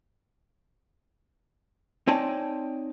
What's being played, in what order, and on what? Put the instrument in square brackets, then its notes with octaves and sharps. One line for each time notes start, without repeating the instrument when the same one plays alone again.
[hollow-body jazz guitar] C4 D#4 C#5 D5 G#5 A5